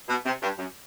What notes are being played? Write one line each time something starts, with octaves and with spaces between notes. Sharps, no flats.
B2
C3
G2
F#2